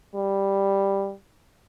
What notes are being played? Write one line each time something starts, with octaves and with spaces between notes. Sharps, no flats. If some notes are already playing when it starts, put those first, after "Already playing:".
G3